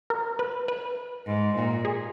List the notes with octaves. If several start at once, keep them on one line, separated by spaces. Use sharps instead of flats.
A#4
B4
B4
G#2
A#2
G#4